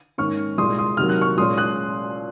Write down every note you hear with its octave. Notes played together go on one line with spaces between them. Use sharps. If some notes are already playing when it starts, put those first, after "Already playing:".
G#2 D#3 A#3 C#4 C#6 F6
C2 A#2 G#3 C6 D#6
C6 D#6
C3 D#3 F#3 A#3 F6
F#6
C#6 F6
A#2 G#3 C#4 C6 D#6
D#6 F#6